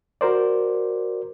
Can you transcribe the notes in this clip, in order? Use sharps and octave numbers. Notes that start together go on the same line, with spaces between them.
F#4 A#4 C5 D5